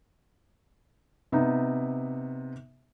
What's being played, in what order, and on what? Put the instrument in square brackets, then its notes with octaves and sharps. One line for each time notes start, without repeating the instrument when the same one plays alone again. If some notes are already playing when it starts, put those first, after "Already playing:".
[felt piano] C3 B3 D#4